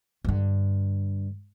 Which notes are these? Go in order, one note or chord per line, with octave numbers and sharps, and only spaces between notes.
G2 D3